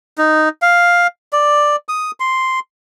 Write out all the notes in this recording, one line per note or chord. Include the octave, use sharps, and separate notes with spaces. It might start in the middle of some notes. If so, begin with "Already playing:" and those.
D#4
F5
D5
D#6
C6